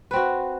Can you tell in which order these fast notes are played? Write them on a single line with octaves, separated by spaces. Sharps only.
B4 C4 F#4